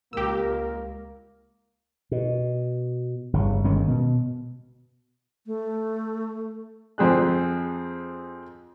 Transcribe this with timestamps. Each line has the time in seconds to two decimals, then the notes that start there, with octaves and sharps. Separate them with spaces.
0.13 C#2 A#3 G4 A#4 E6
2.11 B2
3.33 G1 C#3
3.64 G1 D#3 G#3 C#4
3.88 B2
5.46 A3
6.98 F2 C4 G#4 F#6